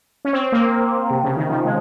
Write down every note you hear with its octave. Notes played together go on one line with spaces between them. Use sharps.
C#4
C4
A#3
C3
C#3
D#3
F3
G#3